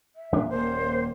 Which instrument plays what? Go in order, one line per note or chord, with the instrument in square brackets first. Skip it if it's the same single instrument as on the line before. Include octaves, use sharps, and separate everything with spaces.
[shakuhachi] E5
[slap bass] E2 A#2 D4
[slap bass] D#1 A#3 [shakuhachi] C5